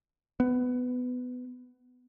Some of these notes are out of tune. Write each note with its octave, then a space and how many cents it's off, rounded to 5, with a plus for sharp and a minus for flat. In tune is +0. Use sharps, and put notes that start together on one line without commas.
B3 +15